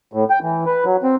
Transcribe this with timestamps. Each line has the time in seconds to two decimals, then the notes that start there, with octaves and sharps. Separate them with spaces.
0.13 A2
0.30 G5
0.42 E3
0.66 B4
0.85 F#3
1.03 C4